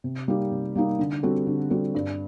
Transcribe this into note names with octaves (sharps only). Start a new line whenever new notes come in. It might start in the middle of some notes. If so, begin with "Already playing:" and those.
C3
G3 A#3 D#4 G4
C3
G3 A#3 D#4 G4
D3
G3 C4 F#4 A4
D3
G3 C4 F#4 A4
G2